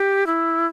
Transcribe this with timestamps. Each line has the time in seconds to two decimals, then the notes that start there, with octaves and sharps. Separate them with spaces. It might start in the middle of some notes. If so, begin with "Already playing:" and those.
Already playing: G4
0.27 E4